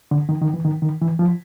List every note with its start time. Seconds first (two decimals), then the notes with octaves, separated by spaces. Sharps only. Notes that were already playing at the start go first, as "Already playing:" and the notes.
0.11 D3
0.29 D#3
0.42 D#3
0.54 E3
0.65 D#3
0.82 D#3
1.01 E3
1.19 F3